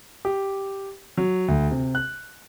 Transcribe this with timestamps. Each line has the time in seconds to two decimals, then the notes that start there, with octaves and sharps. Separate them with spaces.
0.25 G4
1.18 F#3
1.48 D2
1.71 C3
1.95 F#6